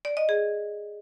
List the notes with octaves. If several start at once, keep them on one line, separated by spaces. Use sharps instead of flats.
D5
D#5
G#4